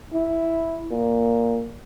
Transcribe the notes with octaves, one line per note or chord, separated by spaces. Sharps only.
E4
A#2